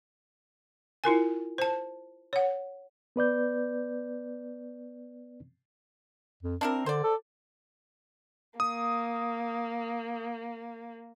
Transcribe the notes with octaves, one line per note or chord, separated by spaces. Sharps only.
E4 F4 A#4 G#5
C5 A5
C#5 F#5
B3 B4 D5 G6
F2
C4 D4 E4 A#4
D3 C5 D5
A4
A#3 D#6